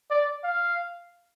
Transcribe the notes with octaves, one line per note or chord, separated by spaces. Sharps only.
D5
F5